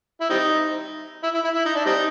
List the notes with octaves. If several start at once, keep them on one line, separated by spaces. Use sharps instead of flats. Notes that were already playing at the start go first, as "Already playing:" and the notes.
E4
G3 C4 D#4
E4
E4
E4
E4
D#4
D4
G3 C4 D#4